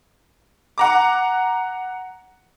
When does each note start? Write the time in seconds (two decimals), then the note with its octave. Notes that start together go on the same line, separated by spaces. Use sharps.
0.78 F#5 A#5 D6